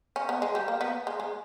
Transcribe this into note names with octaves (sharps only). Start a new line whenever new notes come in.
C#4
B3
G#3
G3
A#3
B3
G#3
G#3